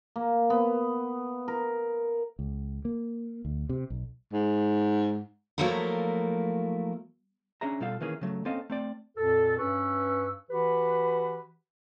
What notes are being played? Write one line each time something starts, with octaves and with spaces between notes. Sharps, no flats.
A#3
B3
A#4
C#2
A#3
D2
C3
B1
G#2
F3 F#3 A3 A#3 E4 A#4
C#4 D4 G#4 E5 A#5
B2 G3 F4 A4 F5
D#3 E3 A#3 C#4 G#4
C#3 F#3 A3
A#3 C4 C#4 A4 D#5 F5
A3 C4 D5
F2 A#2 A4
G2 C#4 B4 C#6 E6
E3 F#4 G4 B4